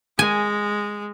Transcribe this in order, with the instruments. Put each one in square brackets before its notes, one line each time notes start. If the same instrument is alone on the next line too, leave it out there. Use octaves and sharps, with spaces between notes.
[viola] G#3 [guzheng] G#5